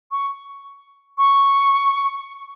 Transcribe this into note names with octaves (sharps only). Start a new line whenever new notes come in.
C#6
C#6